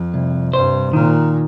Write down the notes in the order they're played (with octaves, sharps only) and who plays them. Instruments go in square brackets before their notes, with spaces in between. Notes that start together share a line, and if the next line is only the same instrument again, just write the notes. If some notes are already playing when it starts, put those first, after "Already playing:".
Already playing: [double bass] F2
[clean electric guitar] C2
[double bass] G2 [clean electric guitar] C5
[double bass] A#2 [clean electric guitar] D#3